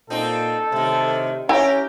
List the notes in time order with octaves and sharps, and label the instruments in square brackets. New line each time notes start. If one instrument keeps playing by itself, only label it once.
[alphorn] A#2 [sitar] C4 D#4 F#4 [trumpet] A4
[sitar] A2 D#3 [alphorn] C3
[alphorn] C#4 [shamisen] E4 G#5 [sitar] G4 A#4 [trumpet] A#5